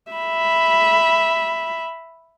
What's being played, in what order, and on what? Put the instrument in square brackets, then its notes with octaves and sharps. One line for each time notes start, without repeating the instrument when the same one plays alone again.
[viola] E5 B5